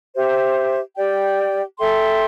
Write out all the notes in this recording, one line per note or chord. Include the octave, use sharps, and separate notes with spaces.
G4 C5 E5
G4 D5 G5
A4 E5 G5 C6